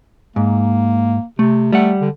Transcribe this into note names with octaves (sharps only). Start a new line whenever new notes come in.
G#2 A#3
C3 A3
G3 A3 F#5
D3